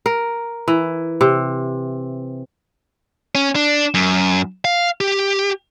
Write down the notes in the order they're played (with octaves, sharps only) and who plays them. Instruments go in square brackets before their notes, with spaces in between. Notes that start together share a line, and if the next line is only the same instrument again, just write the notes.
[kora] A#4
E3
C3
[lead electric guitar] C#4
D4
F#2
F5
G4